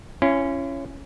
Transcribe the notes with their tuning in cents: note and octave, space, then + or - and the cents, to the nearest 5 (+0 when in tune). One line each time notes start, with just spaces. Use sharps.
C#4 +0 E4 +45